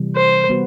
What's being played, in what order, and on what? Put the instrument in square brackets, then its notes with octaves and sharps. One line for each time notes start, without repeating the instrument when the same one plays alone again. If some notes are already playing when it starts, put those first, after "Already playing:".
Already playing: [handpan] C3 E3 G3
[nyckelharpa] C5
[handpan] G3 B3 F#4 B4